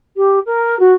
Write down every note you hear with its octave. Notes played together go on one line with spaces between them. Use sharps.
G4
A#4
F#4